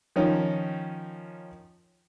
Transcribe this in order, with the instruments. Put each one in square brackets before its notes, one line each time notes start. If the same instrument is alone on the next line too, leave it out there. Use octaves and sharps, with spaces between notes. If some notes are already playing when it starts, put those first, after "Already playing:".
[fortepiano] D#3 F3 C#4 D#4